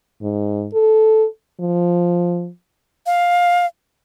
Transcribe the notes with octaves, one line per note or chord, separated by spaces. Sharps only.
G#2
A4
F3
F5